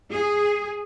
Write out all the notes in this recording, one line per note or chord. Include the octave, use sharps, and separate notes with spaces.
G#4